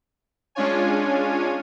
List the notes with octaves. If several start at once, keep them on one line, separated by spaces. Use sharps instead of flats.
G#3 C#4 D4 F4 C#5 G#5